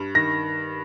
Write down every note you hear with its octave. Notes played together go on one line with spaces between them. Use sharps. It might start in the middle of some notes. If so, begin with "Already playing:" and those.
Already playing: G2
D#3 A#6